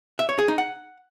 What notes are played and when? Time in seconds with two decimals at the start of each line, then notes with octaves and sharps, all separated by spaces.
0.19 E5
0.29 C#5
0.39 G#4
0.48 D#4
0.58 F#5